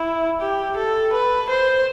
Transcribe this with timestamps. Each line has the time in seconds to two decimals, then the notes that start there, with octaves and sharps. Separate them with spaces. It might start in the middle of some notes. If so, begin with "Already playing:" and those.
Already playing: E4
0.41 G4
0.76 A4
1.13 B4
1.50 C5